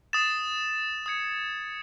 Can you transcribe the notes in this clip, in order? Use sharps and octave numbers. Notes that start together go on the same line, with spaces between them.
D#6 A6 E7
D#6 G#6 C#7